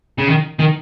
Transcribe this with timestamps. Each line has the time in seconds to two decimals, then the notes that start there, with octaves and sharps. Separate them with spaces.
0.18 C#3
0.28 D#3
0.59 D#3